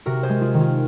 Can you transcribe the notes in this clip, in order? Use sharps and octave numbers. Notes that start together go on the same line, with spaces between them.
C3 F#4 A#4
G#4 C5
G#3
F4 G#4
D#3
F4 G#4